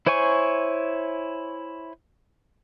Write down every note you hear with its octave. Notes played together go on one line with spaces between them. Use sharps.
E4 C5 C#5 G#5 C#6